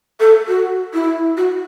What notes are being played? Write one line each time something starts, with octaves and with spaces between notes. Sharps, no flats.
A4
F#4
E4
F#4